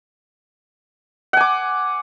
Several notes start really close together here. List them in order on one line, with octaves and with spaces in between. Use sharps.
F#5 G#5 D6